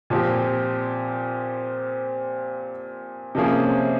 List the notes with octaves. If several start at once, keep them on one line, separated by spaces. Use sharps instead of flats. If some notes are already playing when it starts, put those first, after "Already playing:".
A#2 F3 C4 G4
C3 F3 A#3 C#4 G#4